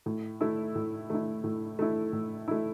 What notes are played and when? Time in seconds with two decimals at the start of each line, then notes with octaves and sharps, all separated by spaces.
0.06 A2
0.41 A3 E4
0.75 A2
1.10 A3 E4
1.44 A2
1.79 A3 E4
2.13 A2
2.48 A3 E4